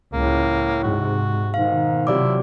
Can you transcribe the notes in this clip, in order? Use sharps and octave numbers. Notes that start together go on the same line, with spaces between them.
C#2 A2 A#3
G#2 C3 F#4
G#2 B2 D#3 F5
C3 F3 F#3 E4 G4 D5 D6